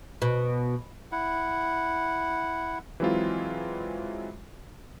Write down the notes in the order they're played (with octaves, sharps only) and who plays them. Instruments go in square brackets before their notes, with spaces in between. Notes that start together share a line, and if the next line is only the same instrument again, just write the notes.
[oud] B2
[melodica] E4 F#5
[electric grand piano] E3 F#3 G#3 C4 E4 F4